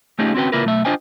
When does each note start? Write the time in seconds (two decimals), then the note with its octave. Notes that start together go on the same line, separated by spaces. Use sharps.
0.19 A3 C#4 D#4 F4 G4 G#4
0.35 C4 C#4 F#4 B4 G5
0.52 C#3 A#3 E4 F4 A#4 B4
0.65 B1 A3 E5
0.85 D4 F4 C5 D#5 G5 G#5